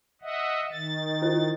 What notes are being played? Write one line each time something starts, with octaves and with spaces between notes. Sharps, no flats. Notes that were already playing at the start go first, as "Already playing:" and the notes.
D#5 E5 F#5
D#3 A6
E4 F4 C5